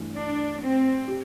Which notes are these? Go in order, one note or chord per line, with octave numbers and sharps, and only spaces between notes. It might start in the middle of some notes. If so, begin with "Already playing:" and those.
Already playing: G2 E3 A3
D4
C4
G4